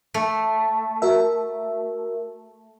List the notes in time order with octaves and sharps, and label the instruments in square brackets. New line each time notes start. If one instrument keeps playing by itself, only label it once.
[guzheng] A3
[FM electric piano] F#4 A#4 E5